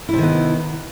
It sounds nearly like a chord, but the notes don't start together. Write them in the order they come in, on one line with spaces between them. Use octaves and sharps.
E4 C3 D#3 B3